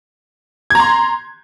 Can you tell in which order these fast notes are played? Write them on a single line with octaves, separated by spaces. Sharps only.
G#6 A#5 C6